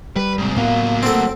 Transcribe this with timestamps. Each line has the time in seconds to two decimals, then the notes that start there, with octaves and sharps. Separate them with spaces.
0.16 G3 B4
0.38 G#2 C3
0.56 A2 F#3 A#3 B3 F5
1.03 A3 C4 A4 F#5